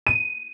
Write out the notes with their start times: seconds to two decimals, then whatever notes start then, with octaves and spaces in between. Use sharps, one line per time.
0.07 D#7